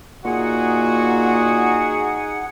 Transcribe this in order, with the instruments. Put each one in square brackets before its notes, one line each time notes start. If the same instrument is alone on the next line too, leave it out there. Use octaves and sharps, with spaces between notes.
[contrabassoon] A#2 [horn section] D#4 G#4 [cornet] F#4 [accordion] F#5